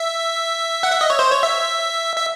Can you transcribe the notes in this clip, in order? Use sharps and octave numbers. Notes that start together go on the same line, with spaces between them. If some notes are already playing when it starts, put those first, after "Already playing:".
Already playing: E5
F#5
E5
D#5
C#5
C5
C#5
E5
E5